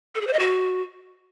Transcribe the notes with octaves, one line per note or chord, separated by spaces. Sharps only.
A4
G#4
C5
D#5
F#4